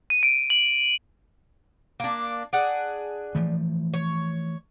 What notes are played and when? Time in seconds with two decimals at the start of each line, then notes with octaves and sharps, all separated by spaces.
0.10 D#7
0.23 D7
0.50 F#7
2.00 A#3 D4
2.53 D4 G#4 F#5
3.35 E3 F3 A3
3.94 C#5